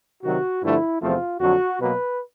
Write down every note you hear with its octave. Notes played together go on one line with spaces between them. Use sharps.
C3 D#3 F#3 F#4
G2 D3 F3 A3 E4
E2 C3 F3 A3 C4 F4
F2 D3 F#3 F#4
B2 F#3 A#3 B4